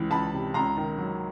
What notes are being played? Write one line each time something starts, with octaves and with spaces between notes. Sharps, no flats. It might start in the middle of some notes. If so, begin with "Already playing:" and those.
Already playing: C#2 E3
C#2 A5 B5
C3
C#2 A#5 C6
D#3
F#3